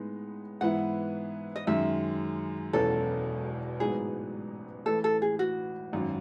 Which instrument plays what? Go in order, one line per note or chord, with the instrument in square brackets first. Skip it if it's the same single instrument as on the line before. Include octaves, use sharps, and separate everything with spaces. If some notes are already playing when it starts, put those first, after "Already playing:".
Already playing: [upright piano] A2 G#3 B3 D#4
[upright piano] G#2 E3 B3 E4 [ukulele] F#5
[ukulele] D#5
[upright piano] F#2 D#3 G#3 [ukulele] E5
[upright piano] E1 E2 B2 F#3 C#4 [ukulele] A4
[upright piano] A1 G#2 F#3 B3 D#4 [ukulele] G#4
[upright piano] A1 A2 E3 [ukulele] A4
[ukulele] A4
G#4
F#4
[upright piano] G#1 F#2 D#3